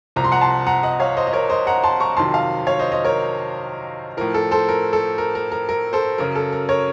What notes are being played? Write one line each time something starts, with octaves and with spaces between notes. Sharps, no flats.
C2 C3 F3 A#5
C6
F#5 A#5
A5 C6
F#5 A#5
D#5 F#5
C#5 F5
C5 D#5
D#5
A#4 C#5
C5 D#5
F#5 A#5
A5 C6
A#5 C#6
F2 C3 D#3 F#3 A5 C6
F5 A5
C#5 F5
C5 D#5
C5 D#5
A#4 C#5
A2 F3 A#4
A4
A4 C5
A#4
A4
A#4
A#4
A#4
A#4
A4 C5
F#2 C#3 F#3 A#4
A4
A#4
A#4 C#5